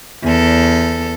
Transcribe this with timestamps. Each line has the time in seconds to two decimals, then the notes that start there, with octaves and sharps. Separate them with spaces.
0.24 E2 A4